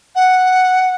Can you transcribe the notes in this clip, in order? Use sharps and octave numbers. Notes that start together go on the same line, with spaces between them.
F#5